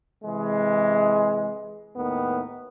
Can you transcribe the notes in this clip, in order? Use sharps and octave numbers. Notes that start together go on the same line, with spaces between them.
C3 E3 G#3
D#2 A2 D#3 B3